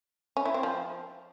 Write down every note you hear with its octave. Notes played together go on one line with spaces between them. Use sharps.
C#4
E4
C4
F3